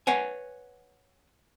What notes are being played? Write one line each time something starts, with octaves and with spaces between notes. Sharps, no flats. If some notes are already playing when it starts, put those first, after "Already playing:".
B4 C#5 F#5 G#5